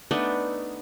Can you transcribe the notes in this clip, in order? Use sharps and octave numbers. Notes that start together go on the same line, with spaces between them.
A3 B3 D4 D#4